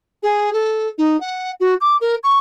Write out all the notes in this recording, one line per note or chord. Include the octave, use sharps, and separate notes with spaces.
G#4
A4
D#4
F#5
F#4
D6
A#4
C#6